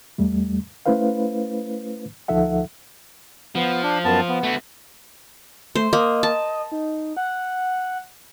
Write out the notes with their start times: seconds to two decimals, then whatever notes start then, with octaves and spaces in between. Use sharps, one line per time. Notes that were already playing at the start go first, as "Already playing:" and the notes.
0.18 E2 G3 A3
0.86 A3 C#4 E4 B4 C5 F5
2.28 D2 F3 D#4 A4 E5 F#5
3.55 F3 B3
3.83 D4
4.05 F#2 B3 A5
4.29 B3
4.43 A3 F#4
5.75 A3 C5
5.93 A#3 D#5
6.23 A5
6.72 D#4
7.17 F#5